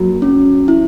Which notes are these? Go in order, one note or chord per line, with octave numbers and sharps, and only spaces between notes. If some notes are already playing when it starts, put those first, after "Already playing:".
Already playing: F#3 A#3
C#4
E4